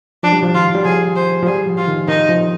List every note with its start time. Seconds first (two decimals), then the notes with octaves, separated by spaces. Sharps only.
0.23 F3 D4
0.33 G3
0.43 F3
0.54 D#3 F4
0.75 G3
0.85 F3 G#4
1.16 C5
1.42 F3
1.46 G3 G#4
1.67 F3
1.77 F4
1.88 D#3
2.08 D#3 D#4
2.29 F3